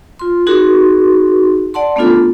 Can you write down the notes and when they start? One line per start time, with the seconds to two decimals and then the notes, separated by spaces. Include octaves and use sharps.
0.19 F4 C6
0.47 D#4 F#4 G#4 A#4 C6
1.74 D5 F#5 A5 C6
1.96 A3 B3 C#4 D4 F4 A4